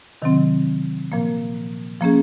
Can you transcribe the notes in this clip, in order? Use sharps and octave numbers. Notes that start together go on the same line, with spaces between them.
C3 D#3 F#3 C4
A#2 F3 A#3
F3 A#3 C#4 G#4